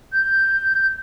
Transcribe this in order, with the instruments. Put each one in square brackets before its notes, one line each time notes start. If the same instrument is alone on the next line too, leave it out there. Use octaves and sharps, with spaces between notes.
[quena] G6